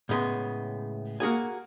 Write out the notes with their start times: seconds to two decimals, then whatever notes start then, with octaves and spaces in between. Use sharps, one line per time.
0.09 A2 C#3 G#3 B3
1.20 A#3 F#4 G#4 G#5